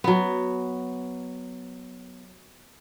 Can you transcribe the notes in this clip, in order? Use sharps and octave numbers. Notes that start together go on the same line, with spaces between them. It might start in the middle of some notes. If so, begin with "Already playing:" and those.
F#3 B3